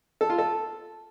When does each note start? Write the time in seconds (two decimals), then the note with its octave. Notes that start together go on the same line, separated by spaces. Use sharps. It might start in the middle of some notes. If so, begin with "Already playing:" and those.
0.21 A4
0.30 F4
0.38 A4